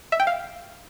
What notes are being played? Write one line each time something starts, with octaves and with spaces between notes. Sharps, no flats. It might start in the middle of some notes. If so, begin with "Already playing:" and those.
E5
G5
F5